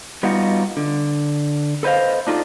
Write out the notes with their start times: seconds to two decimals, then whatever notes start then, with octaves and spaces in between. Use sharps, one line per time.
0.23 G3 B3 D#4 F4 F#4
0.77 D3
1.83 A4 B4 C5 D#5 F5
2.27 D4 D#4 F4 A4